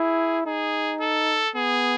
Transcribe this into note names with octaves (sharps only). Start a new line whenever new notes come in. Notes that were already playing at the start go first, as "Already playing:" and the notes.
Already playing: E4 G#4
D#4 G#4
A4
B3 G#4